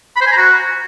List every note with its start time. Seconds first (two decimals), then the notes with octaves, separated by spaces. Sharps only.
0.16 B5
0.21 C5
0.27 G#5
0.32 A#5
0.37 F#4